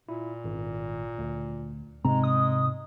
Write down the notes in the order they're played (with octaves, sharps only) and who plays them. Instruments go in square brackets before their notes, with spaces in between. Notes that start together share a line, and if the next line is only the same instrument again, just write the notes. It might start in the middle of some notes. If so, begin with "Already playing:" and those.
[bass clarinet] A#2 [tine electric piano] E4
[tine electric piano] G#1
D2
[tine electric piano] G#2 [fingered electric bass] C3 C4 [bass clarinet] G#3 [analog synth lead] A#5
[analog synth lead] D#6